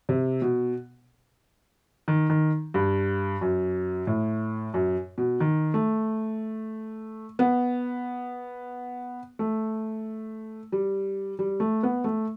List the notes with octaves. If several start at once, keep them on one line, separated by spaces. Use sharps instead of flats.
C3
B2
D#3
D#3
G2
F#2
A2
F#2
B2
D#3
A3
B3
A3
G3
G3
A3
B3
A3